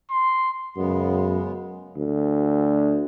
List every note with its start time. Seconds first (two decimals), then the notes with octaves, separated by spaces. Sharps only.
0.11 C6
0.77 F#2 C#3 G#3 B3
1.97 D2